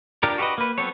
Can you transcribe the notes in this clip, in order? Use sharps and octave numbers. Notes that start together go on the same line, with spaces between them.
D4 F4 G4 A#4
F#4 G4 A4 B4 D#5
A#3 B4
F#3 B3 C4 A4 C#5